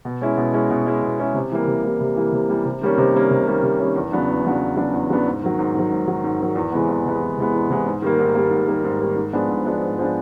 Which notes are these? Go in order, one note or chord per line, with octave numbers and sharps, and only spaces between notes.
B2
G#3 C#4 E4
B2
G#3 C#4 E4
B2
G#3 C#4 E4
B2
G#3 C#4 E4
C3
E3 G3 A#3
C3
E3 G3 A#3
C3
E3 G3 A#3
C3
E3 G3 A#3
C3
D#3 G3 A#3 C#4
C3
D#3 G3 A#3 C#4
C3
D#3 G3 A#3 C#4
C3
D#3 G3 A#3 C#4
E2
C#3 F#3 B3 D4
E2
C#3 F#3 B3 D4
E2
C#3 F#3 B3 D4
E2
C#3 F#3 B3 D4
G#2
D#3 F#3
G#2
D#3 F#3
G#2
D#3 F#3
G#2
D#3 F#3
E2
C3 E3 G#3 B3
E2
C3 E3 G#3 B3
E2
C3 E3 G#3 B3
E2
C3 E3 G#3 B3
G#2
D#3 G3 A#3
G#2
D#3 G3 A#3
G#2
D#3 G3 A#3
G#2
D#3 G3 A#3
G#2
F3 G#3 B3 D4
G#2
F3 G#3 B3 D4
G#2
F3 G#3 B3 D4